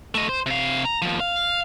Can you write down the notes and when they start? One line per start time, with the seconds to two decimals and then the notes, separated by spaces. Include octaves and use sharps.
0.15 A3 D#5
0.29 C5
0.46 C3 F5
0.85 A#5
1.02 D#2 F3
1.20 F5